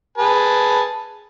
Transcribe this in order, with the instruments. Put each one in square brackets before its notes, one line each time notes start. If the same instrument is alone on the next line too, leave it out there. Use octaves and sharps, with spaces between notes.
[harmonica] G#4 B4 A5